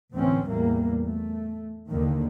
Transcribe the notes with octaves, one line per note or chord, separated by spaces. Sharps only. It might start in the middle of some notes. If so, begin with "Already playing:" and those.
D2 A2 E3 C4 C#4
A1 E2 E3 G3 A#3
A3
D#2 D3 D#3 A#3